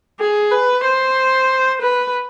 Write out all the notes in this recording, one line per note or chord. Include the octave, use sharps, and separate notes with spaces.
G#4
B4
C5
B4